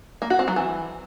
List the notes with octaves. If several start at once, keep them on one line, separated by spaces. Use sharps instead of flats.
A#3
F#4
C4
F#3
E3